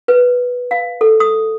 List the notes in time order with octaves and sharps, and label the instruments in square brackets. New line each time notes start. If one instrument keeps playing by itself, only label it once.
[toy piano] B4
F5
A4
D#6